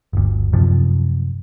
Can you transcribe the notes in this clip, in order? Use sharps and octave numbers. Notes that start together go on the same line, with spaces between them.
G1 D2
F#2 C3 F3